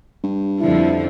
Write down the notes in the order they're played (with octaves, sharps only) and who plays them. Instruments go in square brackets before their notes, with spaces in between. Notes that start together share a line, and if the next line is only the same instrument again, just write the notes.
[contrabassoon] G2
[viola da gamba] F2 D3 F3 [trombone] E4